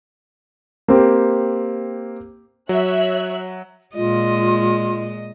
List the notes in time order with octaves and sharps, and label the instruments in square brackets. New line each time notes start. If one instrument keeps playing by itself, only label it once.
[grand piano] A#3 C4 G4
[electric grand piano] F#3 [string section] C#5 E5 F#6
[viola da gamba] A#2 G#3 D#5 [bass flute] F4